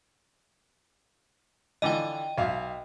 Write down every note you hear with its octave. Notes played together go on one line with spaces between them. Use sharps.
D3 E3 F3 D#5 G5
B1 E5 F5